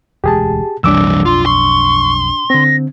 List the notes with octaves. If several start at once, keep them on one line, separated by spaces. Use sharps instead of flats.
E1 D2 G#3 G4 G#4 A5
B1 F2 E3 G3 D4 D6 E6
F4 C6
C6 C#6
D3 C4 A#6